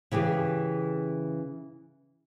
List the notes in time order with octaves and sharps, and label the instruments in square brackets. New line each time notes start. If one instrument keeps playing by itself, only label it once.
[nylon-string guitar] C#3 E3 G4 G#4